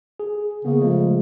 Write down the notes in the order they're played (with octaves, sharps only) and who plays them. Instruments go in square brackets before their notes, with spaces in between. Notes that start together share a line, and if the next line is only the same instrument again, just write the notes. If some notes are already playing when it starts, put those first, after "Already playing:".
[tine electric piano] G#4
[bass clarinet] C#3 [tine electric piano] A#3 B3
[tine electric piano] F3 G#3 A3